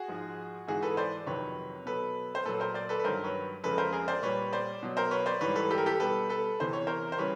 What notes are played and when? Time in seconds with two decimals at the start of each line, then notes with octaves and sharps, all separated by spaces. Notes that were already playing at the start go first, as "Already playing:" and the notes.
Already playing: F#4 G#4
0.08 G#2 F3 G#3
0.68 G#2 E3 G#3 F#4 G#4
0.82 A4 B4
0.97 C5 D5
1.26 F2 C3 D#3 F#3 B4 C#5
1.86 B2 F#3 A4 B4
2.35 C5
2.45 A#2 F#3 A4 B4
2.60 A#4 C5
2.74 C5 D5
2.89 A4 B4
2.99 B4
3.04 G2 D#3 F#3 A#4 C5
3.24 B4 C#5
3.64 F2 C#3 F3 G#3 A4 B4
3.78 A#4 C5
3.93 G#4 A#4
4.08 C5 D5
4.22 A#2 G3 B4 C#5
4.53 C5 D5
4.83 B2 F#3
4.97 A#4 C5
5.11 B4 C#5
5.26 C5 D5
5.41 G#2 E3 G3 B4 C#5
5.55 A4 B4
5.70 G4 A4
5.78 A#4
5.86 G4 A4
6.00 B2 G3 A4 B4
6.29 A4 B4
6.60 E2 C3 E3 C5
6.73 C#5
6.87 A#4 C5
7.12 C5
7.18 C#3 E3 G3 B4 C#5